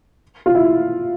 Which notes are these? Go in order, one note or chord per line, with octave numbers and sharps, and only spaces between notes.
F4
E4